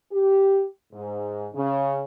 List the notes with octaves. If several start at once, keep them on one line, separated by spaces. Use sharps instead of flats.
G4
G#2
C#3